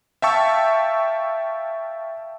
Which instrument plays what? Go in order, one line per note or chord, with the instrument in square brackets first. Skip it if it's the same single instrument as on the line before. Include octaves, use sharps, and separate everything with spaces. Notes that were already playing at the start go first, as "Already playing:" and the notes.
[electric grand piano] E5 F5 G5 A5 C#6 E6